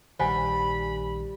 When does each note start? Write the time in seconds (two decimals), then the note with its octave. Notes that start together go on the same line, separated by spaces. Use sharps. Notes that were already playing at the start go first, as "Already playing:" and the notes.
0.19 A#1 D#3 G3 C5 F#5 G#5 B5